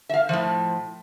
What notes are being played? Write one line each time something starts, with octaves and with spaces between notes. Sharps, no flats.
E5 F5
A2 F3